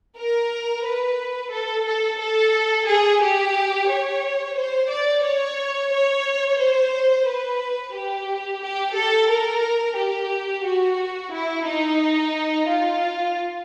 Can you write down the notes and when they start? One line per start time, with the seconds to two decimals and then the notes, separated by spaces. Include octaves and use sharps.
0.16 A#4
0.84 B4
1.51 A4
1.86 A4
2.19 A4
2.86 G#4
3.21 G4
3.89 C#5
4.57 C5
4.90 D5
5.23 C#5
5.92 C#5
6.59 C5
7.27 B4
7.94 G4
8.62 G4
8.95 A4
9.29 A#4
9.97 G4
10.65 F#4
11.32 E4
11.66 D#4
12.68 F4